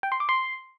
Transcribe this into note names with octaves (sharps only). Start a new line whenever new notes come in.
G5
C6
D6
C6